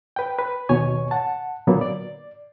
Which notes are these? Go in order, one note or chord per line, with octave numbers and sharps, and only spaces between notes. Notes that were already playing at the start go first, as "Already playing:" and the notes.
B4 G5
B4
D#2 B2 C#5 G#5 C#6
F#5 A5
A#2 D3 F#3 A#3 B3
D5